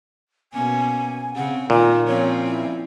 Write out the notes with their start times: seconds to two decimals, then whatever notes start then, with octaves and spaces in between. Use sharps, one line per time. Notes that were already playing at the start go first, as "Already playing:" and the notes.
0.53 B2 A#3 C#4 G#5
1.35 C#3 C4 F#5
1.70 A#2 D#3 F4
2.06 F3 C4 C#4 C#5
2.43 E4